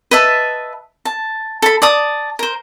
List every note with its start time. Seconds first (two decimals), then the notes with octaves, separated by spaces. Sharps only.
0.11 B4 D#5 E5 A5
1.05 A5
1.62 A4 B5
1.82 D5 A5 D#6
2.39 A#4 C5